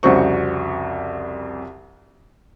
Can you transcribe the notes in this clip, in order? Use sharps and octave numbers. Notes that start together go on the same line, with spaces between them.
C2 F2 C#3 F#4 C5 C#6